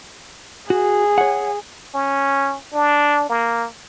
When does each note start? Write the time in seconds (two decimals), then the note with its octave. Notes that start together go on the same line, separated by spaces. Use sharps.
0.70 F#4 G#4
1.18 C#5 F#5
1.94 C#4
2.73 D4
3.29 A#3